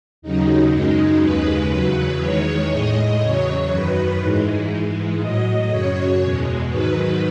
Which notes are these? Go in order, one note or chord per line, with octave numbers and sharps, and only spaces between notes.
D#2 C#3 F#3 D#4
F#2 C#3 G#3 D#4
D#2 C#3 G#3 B4
E2 C#3 F#3 B4
E2 D#3 G#3 C#5
A2 G#3 D#5
E2 C#3 F#3 C#5
F#2 D#3 F#3 B4
G#2 E3 G#3
G#2 E3 G#3
A2 F#3 D#5
F#2 C#3 F#3 C#5
E2 B2 G#3
G#2 D#3 F#3 B4